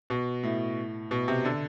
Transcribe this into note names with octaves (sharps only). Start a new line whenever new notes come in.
B2
A2
B2
C3
D3